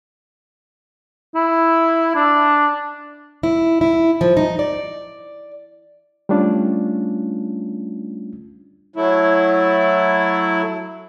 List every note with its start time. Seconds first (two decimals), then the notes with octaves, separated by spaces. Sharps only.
1.35 E4
2.15 D4
3.43 E4
3.81 E4
4.21 F3
4.37 D#4
4.59 D5
6.29 G3 A3 C#4 D4 F4
8.96 F#3 A3 E4